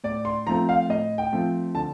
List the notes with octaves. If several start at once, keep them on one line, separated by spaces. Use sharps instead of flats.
A2 D5
C6
F3 A3 C4 A#5
F5
A2 D#5
G5
F3 A3 C4
D3 A5